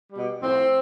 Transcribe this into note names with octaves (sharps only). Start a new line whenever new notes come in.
B2 G3
A2 F3 C4